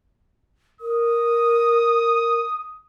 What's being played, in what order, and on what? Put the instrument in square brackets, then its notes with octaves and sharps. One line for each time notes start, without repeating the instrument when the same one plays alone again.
[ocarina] A#4 [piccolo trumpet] D#6